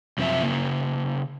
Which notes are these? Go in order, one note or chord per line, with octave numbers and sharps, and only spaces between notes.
F#2 C3 F3 C4 E5
C#3 A#3